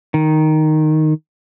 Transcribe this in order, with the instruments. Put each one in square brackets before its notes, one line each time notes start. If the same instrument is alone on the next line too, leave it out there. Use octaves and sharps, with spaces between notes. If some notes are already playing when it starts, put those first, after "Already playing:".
[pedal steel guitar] D#3